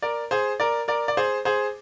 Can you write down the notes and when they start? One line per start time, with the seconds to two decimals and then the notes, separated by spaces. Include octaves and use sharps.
0.02 A#4 D5
0.31 G#4 C5
0.60 A#4 D5
0.88 A#4 D5
1.08 D5
1.17 G#4 C5
1.45 G#4 C5